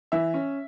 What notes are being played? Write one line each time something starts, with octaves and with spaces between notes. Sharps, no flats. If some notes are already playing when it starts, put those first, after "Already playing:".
E3 E5
C#4